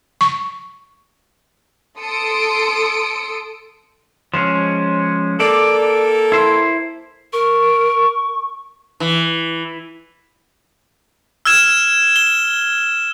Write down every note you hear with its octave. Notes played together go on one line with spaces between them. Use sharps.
C#6
A4 C6 D#6 E6 C#7 D7
F3 G#3 C#4
A#3 A4 D5
E4 C5
A#4 C#6
E3
E6 F6 G#6 E7
G7